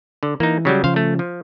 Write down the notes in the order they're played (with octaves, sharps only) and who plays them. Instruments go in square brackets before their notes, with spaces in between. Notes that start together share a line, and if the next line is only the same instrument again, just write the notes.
[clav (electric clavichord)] D3
[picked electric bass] E3 [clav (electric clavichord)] A#3 D#4
[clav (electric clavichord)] C#3 F#3 G3
[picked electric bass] C#3 F3 [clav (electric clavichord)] C5 F5
[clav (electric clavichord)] A3
F3